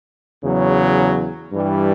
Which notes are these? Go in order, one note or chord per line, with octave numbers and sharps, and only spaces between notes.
E2 C#3 F#3
G2 E3 G3